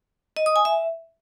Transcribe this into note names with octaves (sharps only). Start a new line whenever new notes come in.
D#5
D#6
G#5
E5